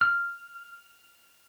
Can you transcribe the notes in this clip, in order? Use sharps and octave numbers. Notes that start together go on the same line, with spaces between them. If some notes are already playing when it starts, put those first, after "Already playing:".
F6